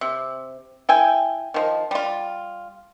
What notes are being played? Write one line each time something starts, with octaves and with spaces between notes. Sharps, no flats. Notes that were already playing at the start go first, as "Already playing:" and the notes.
C3
E4 G5 G#5
D#3 F3
G3 F4